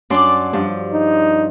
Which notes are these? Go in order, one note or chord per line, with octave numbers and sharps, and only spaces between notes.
F#2 D4 D5 C6 D6
G2 F3 D4
D#4